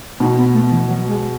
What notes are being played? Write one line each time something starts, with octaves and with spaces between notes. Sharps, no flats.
B2 D#4
B3
A3
E3
F#3
G#3